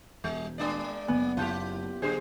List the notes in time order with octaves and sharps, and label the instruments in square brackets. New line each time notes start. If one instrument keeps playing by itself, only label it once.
[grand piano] E1 [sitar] G3
[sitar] G#3 D4 D5
[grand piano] F#1 G#5 [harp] B3
[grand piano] F#1 A5 G6 [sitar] E4 F4 G4
[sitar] F#2 D3 C5 [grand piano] G#4